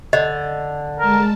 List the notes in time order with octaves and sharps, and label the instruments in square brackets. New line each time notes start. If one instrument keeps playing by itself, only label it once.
[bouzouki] D3 [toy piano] D#5
[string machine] G#3 A5 [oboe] A#4